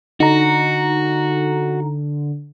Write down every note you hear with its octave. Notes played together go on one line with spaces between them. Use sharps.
D3 D#4 F#4 A#5